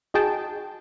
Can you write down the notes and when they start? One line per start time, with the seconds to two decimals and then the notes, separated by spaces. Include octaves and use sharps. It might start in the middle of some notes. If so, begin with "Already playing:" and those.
0.14 D#4 F#4 G#4 G5 A5